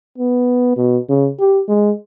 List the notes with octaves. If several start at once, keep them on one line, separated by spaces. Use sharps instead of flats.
B3
B2
C#3
G4
G#3